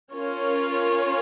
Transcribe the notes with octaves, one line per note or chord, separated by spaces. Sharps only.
C#4 F4 A#4 C#5